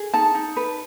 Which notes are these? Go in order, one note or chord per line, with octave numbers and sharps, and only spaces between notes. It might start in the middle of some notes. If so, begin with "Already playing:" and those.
Already playing: G#4
D#4 A5
D#4
B4